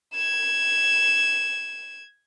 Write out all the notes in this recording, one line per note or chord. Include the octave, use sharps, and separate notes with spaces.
G#6 E7